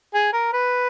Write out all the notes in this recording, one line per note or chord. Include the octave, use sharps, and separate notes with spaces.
G#4
A#4
B4